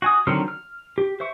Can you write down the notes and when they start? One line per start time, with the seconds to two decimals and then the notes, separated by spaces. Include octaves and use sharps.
0.02 F#4 G#5 D#6
0.27 D3 D#3 F#3 C4 F6
0.48 F6
0.98 G4
1.20 C5 E5 C#6